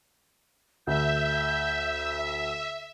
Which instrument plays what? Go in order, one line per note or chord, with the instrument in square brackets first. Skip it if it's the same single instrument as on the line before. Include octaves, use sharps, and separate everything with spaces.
[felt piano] D2 [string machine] E5 [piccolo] G6